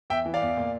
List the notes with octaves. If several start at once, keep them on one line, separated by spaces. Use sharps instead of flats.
E2 E5 G5
E3
D5 F5
E2
A#2